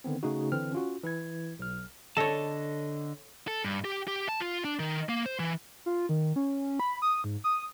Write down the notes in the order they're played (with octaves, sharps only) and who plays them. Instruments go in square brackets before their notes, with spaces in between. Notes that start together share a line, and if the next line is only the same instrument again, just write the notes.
[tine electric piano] D3 D#3 B3 C4
C#3 A3 D#4 F#4
D3 E3 C4 F6
C#4 F4 F#4
E3 E4 G#6
B1 F6
[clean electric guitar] D3 D#5 A5 [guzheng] A4 C#5
[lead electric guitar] A4
G2
G4
G4
A5
F4
D4
D#3
A#3
C5
E3
[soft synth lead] F4
D#3
C#4
B5
D#6
G#2
D#6